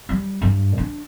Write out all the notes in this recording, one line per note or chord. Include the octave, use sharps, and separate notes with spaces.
G3
G2
D4